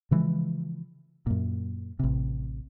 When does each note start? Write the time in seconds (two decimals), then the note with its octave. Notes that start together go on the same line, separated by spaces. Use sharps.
0.11 C#3 E3 F3 G#3
1.27 F#2 A#2
1.99 A1 C3